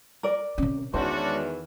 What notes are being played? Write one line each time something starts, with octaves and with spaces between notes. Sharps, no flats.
A#4 D5
C3 C#4
E2 D#3 E3 G#3 C#4 D4 F#4 C5